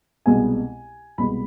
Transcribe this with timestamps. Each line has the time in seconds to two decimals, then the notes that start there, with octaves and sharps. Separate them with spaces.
0.26 C2 B2 G#3 B3 G#5
1.18 C2 B2 G#3 B3 B5